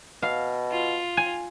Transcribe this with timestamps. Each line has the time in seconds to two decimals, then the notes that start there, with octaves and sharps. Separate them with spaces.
0.22 B2 F5
0.72 F4
1.17 G#5